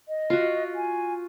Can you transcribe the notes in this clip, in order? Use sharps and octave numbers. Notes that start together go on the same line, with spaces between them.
D#5
F4 F#4
G#5